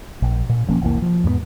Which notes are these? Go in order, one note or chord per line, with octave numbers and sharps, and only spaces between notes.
A#1
A#2
E1 F3 A#3 C#4
F1 C2 E3 A#3
F3
E2 G#2 G3 B3